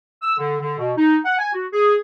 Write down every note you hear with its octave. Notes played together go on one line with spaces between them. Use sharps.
E6
D3
D3
B2
D#4
F#5
G#5
F#4
G#4